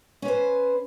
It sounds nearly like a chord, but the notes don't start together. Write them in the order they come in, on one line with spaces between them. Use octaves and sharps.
C#4 B4 C5